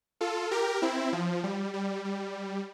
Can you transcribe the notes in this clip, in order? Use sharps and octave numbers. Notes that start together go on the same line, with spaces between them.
F4 A4
G4 A#4
C4 E4
F3
G3
G3
G3